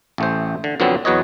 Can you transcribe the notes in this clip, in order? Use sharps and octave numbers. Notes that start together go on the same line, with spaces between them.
A1 A3 C5
D3
F2 D3 F#3 B3 C4
E2 F#3 B4 C#5 D#5